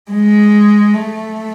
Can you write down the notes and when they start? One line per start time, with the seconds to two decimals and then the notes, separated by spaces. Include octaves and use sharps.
0.11 G#3
0.94 A3